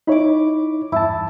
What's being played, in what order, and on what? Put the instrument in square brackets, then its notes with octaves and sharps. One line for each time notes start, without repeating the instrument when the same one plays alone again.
[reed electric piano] D#4 E4 C#5 [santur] B5 D6
[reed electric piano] E2 G2 A5 [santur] E4